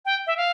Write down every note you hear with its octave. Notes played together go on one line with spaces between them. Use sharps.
G5
E5
F5